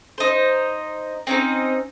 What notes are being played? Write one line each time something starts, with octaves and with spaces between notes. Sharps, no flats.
D#4 C5
C4 C#4 D#4